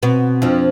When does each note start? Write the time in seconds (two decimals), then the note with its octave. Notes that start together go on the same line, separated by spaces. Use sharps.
0.03 B2 B3 C4
0.42 F2 F3 D4